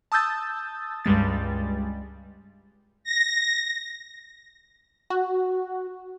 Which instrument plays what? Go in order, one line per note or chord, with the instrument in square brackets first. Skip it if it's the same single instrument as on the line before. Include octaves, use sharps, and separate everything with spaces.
[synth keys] A5 D#6 E6 G6 A6
C#2 G2 G3 G#3 A6
[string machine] A#6
[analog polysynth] F#4